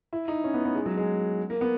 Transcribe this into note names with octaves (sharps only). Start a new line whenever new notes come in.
E4
D#4
C#4
B3
B3
G#3
F#3
G#3
A#3
B3